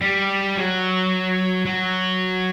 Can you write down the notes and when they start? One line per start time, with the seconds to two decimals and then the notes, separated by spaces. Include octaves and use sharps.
0.01 G3
0.56 F#3
1.65 F#3